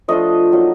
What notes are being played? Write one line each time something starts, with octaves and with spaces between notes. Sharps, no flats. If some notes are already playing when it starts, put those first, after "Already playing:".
F3 A3 D4 F4 D#5
F#3 A#3 D#4